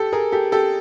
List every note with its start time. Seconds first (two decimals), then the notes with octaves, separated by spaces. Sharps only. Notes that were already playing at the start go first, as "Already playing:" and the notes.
Already playing: G4 A4
0.13 G#4 A#4
0.32 G4 A4
0.52 G4 A4